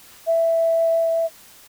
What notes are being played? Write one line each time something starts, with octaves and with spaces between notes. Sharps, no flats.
E5